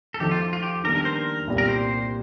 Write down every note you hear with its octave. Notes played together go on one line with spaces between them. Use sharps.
A4
F3 A3 D#4 G4
F4
F4
G4
D#3 G3 A#3 D4 A#4
A#4
C5
A#4
C2 A#2 G3
A#4
C5